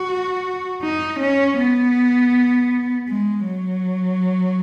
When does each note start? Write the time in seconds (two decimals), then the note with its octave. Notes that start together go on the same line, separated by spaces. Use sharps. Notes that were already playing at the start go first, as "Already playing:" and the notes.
Already playing: F#4
0.82 D#4
1.20 C#4
1.58 B3
3.09 G#3
3.46 F#3